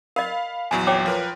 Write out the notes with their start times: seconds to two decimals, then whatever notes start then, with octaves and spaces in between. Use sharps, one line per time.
0.16 A#4 D#5 F5 B5
0.71 A#1 E2 F#3 G#5
0.87 C#5 G5 D6
1.06 F3 A#4 B4